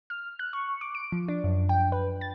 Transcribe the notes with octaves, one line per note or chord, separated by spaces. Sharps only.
F6
F#6
C#6
D6
D7
F3
D4
F#2
G5
B4
A6